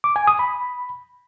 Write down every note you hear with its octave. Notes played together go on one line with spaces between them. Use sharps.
D6
G#5
D#6
B5